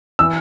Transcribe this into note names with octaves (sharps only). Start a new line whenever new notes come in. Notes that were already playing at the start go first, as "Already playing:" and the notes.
E3 E6